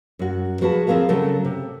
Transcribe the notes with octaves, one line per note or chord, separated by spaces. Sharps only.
F#2 F#4
F3 F#4 G#4 B4 A5
D2 F3 C4 G#4 A#4 F5
C#3 F#3 A3 A4 A#4
C3